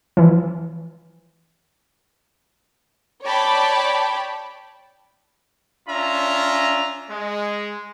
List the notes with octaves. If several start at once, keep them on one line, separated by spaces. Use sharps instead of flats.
E3 F3
C#5 D5 G5 A5 B5
C#4 D4 F4 E5 A#5
G#3